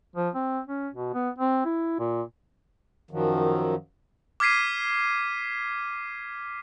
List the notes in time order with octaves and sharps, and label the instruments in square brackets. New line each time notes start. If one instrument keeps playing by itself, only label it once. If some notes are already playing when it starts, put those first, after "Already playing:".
[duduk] F3
C4
C#4
B2
B3
C4
E4
A#2
[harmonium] F#2 D#3 F3 F#3
[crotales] D6 F6 G#6 B6 C7 D#7